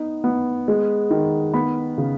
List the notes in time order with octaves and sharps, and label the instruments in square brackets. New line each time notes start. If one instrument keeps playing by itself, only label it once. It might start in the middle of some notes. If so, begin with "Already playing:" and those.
Already playing: [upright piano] B3 D#4
B3
G#3
D#3
B3 B5
C#3